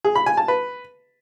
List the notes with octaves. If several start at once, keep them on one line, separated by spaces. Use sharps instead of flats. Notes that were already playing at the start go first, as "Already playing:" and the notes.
G#4
B5
G#5
A5
B4